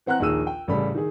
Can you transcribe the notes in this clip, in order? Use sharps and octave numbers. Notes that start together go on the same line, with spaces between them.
E3 C4 F#5 A#5 F#6
A#1 D#2 D#3 G#4 E6 D#7
G5
A1 C#3 G3 A4 D5 B5
D#3 G#4